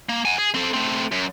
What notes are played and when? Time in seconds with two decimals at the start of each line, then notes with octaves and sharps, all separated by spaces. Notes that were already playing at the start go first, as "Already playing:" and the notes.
0.09 A#3
0.25 F#5 G#5
0.38 G#4
0.54 C4 A4
0.74 A3 C4
1.11 F#2